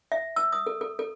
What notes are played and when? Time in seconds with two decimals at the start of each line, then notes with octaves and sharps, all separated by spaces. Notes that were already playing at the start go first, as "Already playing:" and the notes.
0.12 E5
0.36 E6
0.52 D#6
0.67 A4
0.81 A4
0.99 A4